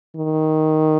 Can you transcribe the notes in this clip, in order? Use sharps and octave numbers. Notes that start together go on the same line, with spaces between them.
D#3